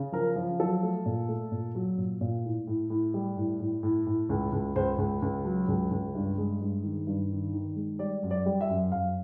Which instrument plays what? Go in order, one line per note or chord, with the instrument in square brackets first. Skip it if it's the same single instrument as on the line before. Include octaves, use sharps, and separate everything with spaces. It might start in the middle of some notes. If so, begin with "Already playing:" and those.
Already playing: [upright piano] C#3
F3 A#4
F3
F#3 A4
A3
A#2
A3
A#2
F#3
A#2
A#2
A2
A2
A2
G3
A2
A2
A2
A2
C#2
C#2
C#2 C5
C#2
C#2
F#3
C#2
C#2
G2
G#3
G2
D#3
G2
D#3
D#3
G#3
G3 D5
F#2
D5
G3
E5
F#2
F#2 F5